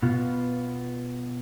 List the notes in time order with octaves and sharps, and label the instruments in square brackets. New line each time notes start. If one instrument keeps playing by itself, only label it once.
[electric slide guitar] B2 B3 F4